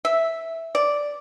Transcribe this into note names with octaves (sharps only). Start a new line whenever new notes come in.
E5
D5